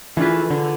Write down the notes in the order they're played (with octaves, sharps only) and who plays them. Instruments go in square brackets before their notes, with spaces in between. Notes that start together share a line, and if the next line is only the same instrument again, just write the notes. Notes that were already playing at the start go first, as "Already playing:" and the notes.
[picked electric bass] E3 [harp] A3 D4 F4 G#4 B4
[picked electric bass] D3